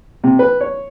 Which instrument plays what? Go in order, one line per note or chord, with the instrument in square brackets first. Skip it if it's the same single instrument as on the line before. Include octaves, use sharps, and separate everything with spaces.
[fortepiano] C3
B4
C#5